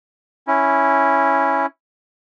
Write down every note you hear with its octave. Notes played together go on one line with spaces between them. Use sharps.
C#4 E4